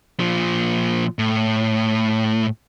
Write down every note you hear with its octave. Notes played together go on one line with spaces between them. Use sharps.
A#2 F3
A2